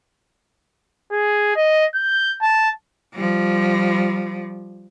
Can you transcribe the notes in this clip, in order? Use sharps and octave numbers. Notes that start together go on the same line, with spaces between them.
G#4
D#5
G6
A5
F3 G3